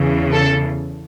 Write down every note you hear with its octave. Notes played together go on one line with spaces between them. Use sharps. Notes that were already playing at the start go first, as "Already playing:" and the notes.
Already playing: E2 C#3 E3
A4